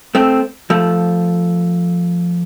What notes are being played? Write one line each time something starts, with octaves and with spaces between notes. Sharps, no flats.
A3 C4
F3 A3